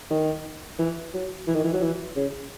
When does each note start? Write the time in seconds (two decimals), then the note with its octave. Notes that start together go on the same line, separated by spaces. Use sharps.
0.10 D#3
0.79 E3
1.14 F#3
1.47 E3
1.55 D#3
1.64 E3
1.73 F#3
1.81 E3
2.16 C#3